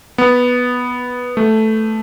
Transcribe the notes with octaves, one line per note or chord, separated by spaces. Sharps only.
B3
A3